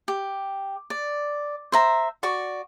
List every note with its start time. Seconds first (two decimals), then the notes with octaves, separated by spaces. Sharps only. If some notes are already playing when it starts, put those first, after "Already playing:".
0.08 G4
0.90 D5
1.72 C5 E5 A#5
2.23 F#4 D5 C#6